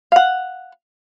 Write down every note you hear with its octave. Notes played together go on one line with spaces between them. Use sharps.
F5 F#5